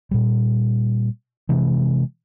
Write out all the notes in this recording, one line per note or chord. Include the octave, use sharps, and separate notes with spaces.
A#2 G3
C3 E3 G#3